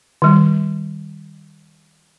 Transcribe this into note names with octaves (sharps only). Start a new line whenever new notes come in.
D#3 G3